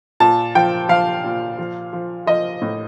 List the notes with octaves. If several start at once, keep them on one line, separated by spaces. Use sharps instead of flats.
A#2 A5
F3 G5
F3 F5
A#2
F3
F3
F3 D#5
A2